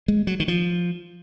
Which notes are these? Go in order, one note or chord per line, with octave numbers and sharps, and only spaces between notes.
G#3
F#3
D#3
F3